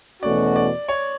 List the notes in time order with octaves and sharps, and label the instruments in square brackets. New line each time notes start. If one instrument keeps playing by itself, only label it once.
[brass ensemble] E2 B2 A3 C#4 F#4 [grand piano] D5
[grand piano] D5
C#5